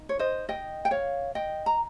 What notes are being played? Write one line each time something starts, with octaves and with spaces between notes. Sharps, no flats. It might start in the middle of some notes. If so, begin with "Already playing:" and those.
Already playing: D#4
C#5
C5 D#5
D#5 G5
G5
C#5 F5
D#5 G5
A#5